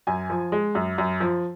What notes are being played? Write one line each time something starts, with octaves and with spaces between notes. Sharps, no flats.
F#2 G#5
F3
G#3
F#2
F#2
F3